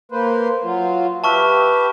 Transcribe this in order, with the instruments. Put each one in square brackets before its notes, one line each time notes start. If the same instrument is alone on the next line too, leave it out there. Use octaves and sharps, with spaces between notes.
[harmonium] A#3 B4 C5
F#3 F4
[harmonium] G4 B4 E5 [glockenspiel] A5 C#6 F6